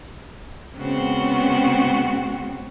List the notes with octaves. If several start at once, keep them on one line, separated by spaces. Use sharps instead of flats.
C#3 G#3 B3 C4 F#4